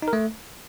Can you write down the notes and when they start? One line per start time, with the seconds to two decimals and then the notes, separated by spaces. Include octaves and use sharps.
0.02 D#4
0.08 A#4
0.13 A3